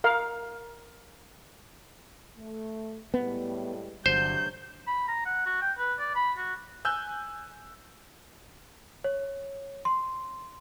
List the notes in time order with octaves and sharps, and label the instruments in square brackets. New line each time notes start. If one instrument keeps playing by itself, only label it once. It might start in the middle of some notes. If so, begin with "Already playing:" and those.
[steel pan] A#4 F5
[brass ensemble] A3
[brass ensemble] A2 G3 G#3 [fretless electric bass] B3
[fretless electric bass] G1 [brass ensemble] C3 F#3 D4 [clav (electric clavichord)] C5 [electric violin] G6
[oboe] B5
A#5
F#5
F#4
G5
B4
D5
B5
F#4
[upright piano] G#5 E6 F#6 G6
[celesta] C#5
C6